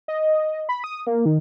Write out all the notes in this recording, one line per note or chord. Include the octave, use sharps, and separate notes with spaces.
D#5
B5
D#6
A#3
D#3